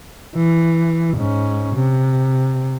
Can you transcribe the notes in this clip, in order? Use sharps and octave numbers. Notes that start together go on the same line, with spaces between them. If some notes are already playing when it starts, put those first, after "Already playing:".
E3
G#2 C#4
C3